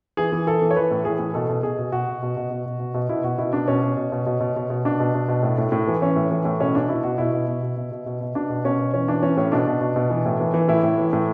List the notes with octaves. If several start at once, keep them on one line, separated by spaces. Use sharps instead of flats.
E3 G#4
E3
E3 A4
E3
C#5
E3 B4
A2
E3 G#4
A2
B2 A4
B2
B2 G#4
B2
B2 F#4
B2
B2
B2
B2
B2
B2
B2
B2 E4
B2 F#4
B2 E4
B2 D4
B2 C#4
B2
B2
B2
B2
B2
B2
B2
B2 D4
B2
B2
B2
A2
A2
A2
E3
E3 C#4
A2
E3
A2
B2 C#4
B2 D4
B2 E4
B2 F#4
B2 E4
B2
B2
B2
B2
B2
B2
B2
B2 D4
B2
B2 C#4
B2
E3 C#4
E3 D4
E3 C#4
A2 C#4
B2 D4
B2
B2
B2
E3
A2
E3
E3
A2 E4
A2
E3
A2